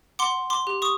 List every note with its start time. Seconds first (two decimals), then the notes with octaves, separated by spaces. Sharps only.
0.19 F#5 C6 D6
0.50 C6 D6
0.67 G4
0.82 C#6 D#6